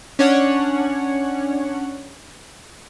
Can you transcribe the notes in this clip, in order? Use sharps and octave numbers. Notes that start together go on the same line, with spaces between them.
C#4 D4 C#5 F#5